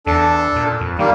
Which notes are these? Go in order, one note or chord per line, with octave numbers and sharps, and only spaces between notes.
E2 D4 A4
A#2
F2
D#3 G3 A#3